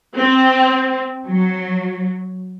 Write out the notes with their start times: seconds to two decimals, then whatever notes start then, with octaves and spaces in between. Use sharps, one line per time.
0.16 C4
1.26 F#3